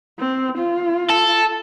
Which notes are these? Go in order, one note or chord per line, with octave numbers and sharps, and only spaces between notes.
C4
F4
A4